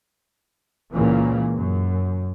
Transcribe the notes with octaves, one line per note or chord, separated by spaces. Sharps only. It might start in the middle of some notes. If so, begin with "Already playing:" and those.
C#2 A#2 C#3 E3 A#3
F#2